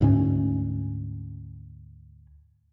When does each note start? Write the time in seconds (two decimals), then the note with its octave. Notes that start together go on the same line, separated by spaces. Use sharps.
0.01 D2 G#2 G#3 C#4